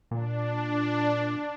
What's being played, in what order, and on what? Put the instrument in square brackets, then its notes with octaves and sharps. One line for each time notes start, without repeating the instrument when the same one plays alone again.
[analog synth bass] A#2 [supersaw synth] D4